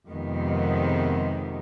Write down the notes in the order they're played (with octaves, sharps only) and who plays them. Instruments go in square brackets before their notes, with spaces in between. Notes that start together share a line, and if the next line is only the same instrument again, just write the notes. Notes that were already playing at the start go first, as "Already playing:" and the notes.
[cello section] F2 C3 D#3 G#3 B3